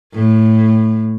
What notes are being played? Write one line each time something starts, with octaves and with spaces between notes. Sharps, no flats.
A2